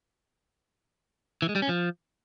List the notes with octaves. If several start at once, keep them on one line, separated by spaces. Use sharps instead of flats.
E3
G#3
G3
C#4
F3